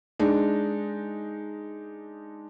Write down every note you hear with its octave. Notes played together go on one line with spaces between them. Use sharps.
G#3 D4 D#4